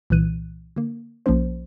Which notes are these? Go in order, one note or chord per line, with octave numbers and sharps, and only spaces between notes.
C2 A#2 E3 F#6 D#7
D3 A#3
B1 F3 A#3 C#4 C5